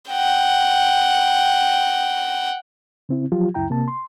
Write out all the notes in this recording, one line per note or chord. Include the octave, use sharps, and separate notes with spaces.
F#5 G5
C#3 C4 E4
F3 F#3 F4 G4
C#2 F#2 E4 G5 A#5
C3 A#3 A5
C6